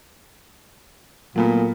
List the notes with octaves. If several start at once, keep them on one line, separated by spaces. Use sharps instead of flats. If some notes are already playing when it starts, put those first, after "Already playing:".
A#2 F#3 A3 B3